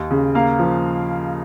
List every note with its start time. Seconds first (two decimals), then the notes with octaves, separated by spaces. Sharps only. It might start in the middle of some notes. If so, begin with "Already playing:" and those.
Already playing: D#2
0.11 C#3
0.35 A#3 F5
0.59 F3